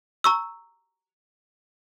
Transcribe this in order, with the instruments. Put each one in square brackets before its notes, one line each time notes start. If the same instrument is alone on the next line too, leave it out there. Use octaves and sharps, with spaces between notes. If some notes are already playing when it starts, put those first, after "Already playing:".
[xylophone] A#5 C#6 E6